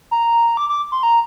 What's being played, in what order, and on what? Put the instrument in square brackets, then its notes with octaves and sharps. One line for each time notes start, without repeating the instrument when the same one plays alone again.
[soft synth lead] A#5
D6
D6
C6
A#5